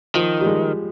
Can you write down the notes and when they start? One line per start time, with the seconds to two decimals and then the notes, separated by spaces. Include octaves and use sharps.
0.15 D#3 F3
0.40 G3
0.47 G#3